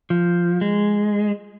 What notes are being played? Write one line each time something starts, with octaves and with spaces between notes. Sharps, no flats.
F3
G#3